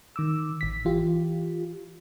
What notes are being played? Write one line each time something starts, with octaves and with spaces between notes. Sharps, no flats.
D#3 D6 E6
A1 B6
E3 F4 G4